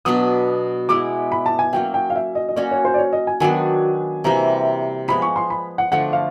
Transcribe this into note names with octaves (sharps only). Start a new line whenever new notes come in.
B2 F#3 B3 D4 D#6
G#3 B3 E4 D6
B5
A5
G#5
F#3 A#3 C#4 G5
G5
F5
E5
D#5
D#5
A#3 C#4 F#4 D5
C#5
C5
D5
C#5
D#5
G#5
D#3 F#3 B3 D4 G#5
C3 E3 G3 A#3 A#5
F3 G#3 B3 B5
C#6
C6
B5
F#5
D3 F3 A3 D4 F#5
F5